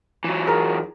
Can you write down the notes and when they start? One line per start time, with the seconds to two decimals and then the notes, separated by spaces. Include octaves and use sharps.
0.24 E3 F#3
0.46 G#4 A#4 A#5